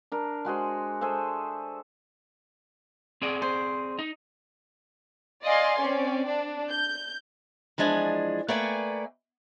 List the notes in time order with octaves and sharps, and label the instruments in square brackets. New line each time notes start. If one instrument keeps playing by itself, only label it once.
[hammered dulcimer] D4 A#4
G#3 F#4 G#4 C5
G#4 A4 C5 E5
[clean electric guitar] C4 G#4 D5
[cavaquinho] C5
[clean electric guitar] D#4
[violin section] D5 D#5 F5 G#5 C6
C4 C#4 D5
D4
G6
[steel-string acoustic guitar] E3 F3 G#3 D4 G#5
A3 A#3 B4 D5 G5 G#5